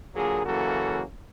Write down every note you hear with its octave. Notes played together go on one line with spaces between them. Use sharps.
A#2 D3 F#3 A#3 G#4
C#3 E3 F#3 A#3 F#4 A4